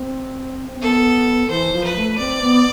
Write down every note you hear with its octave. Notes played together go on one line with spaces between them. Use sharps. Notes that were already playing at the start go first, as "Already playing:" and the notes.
Already playing: C4
C4
B3 A4
E3 C5
F3
B4
A3
C4 D5
B3